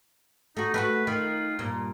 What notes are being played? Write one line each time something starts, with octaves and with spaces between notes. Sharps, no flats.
A3 D#4 F#4
A3 F4 F#4 B4
D#3 F4
G2 A#2